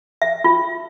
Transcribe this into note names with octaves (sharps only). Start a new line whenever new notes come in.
E5
F4